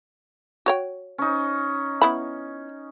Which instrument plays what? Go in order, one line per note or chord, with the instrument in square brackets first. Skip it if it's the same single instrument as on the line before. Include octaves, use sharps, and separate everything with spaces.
[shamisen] F#4 C#5 G5
[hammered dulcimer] C#4 D#4
[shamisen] B3 E4 B5